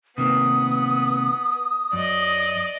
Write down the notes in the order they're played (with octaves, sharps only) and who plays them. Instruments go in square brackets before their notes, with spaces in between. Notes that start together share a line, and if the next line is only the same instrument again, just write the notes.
[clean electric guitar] C3 D#3 A#3 [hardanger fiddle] B3 [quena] D#6
[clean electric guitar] F#2 [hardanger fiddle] D5 D#5